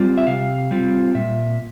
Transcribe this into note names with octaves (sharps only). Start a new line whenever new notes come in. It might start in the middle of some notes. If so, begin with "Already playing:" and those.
Already playing: G3 C4 F4
E5
C3 F5
G3 C4 F4
A#2 E5